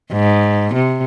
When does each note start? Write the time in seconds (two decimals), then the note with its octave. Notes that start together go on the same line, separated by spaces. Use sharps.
0.13 G#2
0.74 C3